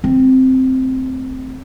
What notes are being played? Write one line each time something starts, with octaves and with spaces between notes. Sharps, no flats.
A3 C4